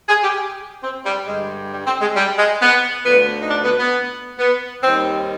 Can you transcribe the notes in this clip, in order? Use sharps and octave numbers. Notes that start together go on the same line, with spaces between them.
G#4
G4
C4
G3
G2 D3 G3 G#3
G3
C4
G#3
G3
G#3
B3
D2 D3 F3 B3
D#4
D4
B3
B3
B3
D#2 D#3 G3 C4